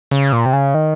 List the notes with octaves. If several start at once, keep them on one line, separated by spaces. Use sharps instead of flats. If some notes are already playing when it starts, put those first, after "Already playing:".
C#3
A#2
C3
C#3
D#3